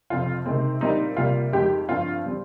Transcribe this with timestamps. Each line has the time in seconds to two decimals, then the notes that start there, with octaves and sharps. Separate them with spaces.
0.10 F2 C3 F3 C4 F4
0.46 C3 D#3 G#3 C4
0.81 A#2 G3 C4 D#4
1.17 C3 G3 A#3 F4
1.52 F2 D#3 G#3 G4
1.88 G2 F3 C4 F4
2.26 G3 C4